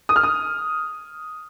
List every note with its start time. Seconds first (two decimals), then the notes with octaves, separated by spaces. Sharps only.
0.09 D#6
0.16 F6
0.23 D#6